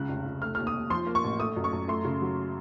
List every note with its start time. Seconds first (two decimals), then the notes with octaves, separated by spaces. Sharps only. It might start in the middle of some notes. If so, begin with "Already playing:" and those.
Already playing: C#2 C#3 F#6
0.09 F1
0.26 F1
0.42 A3 F6
0.55 D#2 F6
0.67 D#6
0.74 D#2
0.90 F3 C6
1.07 A#3
1.15 C#6
1.24 A1
1.40 A3 D#6
1.57 F#2
1.64 C#6
1.73 F#2
1.88 A3 C6
2.05 C#3
2.22 F#3